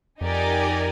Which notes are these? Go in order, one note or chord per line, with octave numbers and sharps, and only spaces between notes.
F2 D#4 G4 A#4 D5 G#5